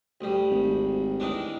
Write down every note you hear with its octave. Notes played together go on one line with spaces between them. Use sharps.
D2 G3
G#1
D#3 E3 D4